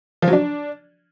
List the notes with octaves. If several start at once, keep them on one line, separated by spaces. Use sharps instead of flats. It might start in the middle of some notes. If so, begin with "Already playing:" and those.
F3
F#3
D4